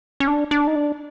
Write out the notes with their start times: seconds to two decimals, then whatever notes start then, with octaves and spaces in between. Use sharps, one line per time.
0.20 C#4
0.28 D4
0.51 D4
0.67 D#4
0.75 D4